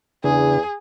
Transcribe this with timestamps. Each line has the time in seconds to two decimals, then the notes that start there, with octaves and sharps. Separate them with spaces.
0.24 E2 C#3 D4 G#4